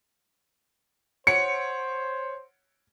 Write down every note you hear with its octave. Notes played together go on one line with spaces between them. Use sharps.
C5 C#5 F#5 C#7 D7